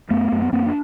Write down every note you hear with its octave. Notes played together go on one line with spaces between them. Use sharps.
F#2 A3 B3
F#2
B3
F#2 A#3 C4
D4